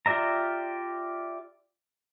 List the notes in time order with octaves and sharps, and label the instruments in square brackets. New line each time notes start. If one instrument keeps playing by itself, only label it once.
[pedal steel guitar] F4 G4 D5 E5 A#5